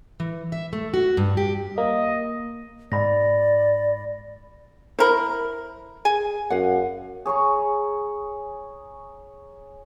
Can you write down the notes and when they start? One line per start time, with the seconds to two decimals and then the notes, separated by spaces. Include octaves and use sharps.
0.20 E3
0.52 E5
0.73 A3
0.94 F#4
1.17 G2
1.37 G4
1.78 A#3 D#5
2.92 G#2 D5 B5 A#6
4.99 E4 A#4 C5 B5
6.05 G#4 G#5
6.50 F#2 F5 F#5
7.26 G#4 C#5 A#5 C#6